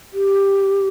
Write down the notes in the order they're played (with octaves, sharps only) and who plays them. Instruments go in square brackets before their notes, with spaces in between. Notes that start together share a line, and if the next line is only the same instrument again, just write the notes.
[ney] G4